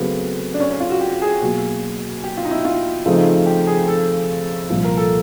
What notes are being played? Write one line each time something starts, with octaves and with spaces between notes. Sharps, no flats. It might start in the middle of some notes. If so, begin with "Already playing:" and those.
Already playing: C#3 F#3 A3 B3 C4
D4
C#4
C#4
F4
F#4
G4
G#4
B2 F#3 A#3
G4
F4
D#4
E4
F4
C#3 F3 A3 C4 D#4
G4
G#4
A4
C2 A#2 F3
A#4
A4